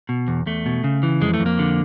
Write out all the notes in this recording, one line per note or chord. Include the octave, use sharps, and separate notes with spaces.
B2
E2
E2 A3
B2
C#3
E3
F2 G#3
A3
F2
A#3
D3